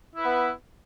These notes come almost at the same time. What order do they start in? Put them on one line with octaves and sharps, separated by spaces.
E4 B4 B3